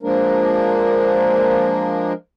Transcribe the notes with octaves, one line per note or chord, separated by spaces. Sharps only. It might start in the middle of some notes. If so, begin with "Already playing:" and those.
F3 G#3 A#3 D4 A#4